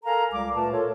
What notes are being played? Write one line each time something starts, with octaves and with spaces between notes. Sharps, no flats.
A4 A#4 F5 G#5 A#5
C#2 G3 F5 D6
A#2 A3 B4 A5
F4 A4 A#4 C#5